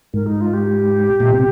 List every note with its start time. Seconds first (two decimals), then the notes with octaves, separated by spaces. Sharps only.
0.14 G#2 A#4
0.27 D#4
0.41 F4
0.54 G4
1.20 A#2
1.34 C3